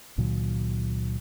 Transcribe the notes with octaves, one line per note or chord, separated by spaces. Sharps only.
C#2 A#2 D#3 F#3